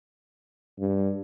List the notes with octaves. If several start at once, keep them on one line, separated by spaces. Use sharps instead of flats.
G2